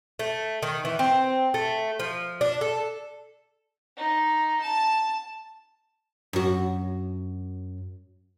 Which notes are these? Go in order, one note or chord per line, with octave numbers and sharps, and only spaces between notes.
A3
D#3
E3
C4
A3
F3
D4
A4
D#4
A5
F#2 F#4